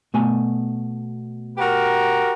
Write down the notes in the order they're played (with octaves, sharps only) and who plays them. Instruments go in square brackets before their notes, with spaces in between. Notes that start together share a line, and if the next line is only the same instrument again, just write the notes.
[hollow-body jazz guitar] B2 A3 G#5
[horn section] F#4 G4 A#4